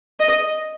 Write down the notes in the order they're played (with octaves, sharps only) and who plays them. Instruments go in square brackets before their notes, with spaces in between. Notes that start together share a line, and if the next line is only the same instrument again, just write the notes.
[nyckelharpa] D#5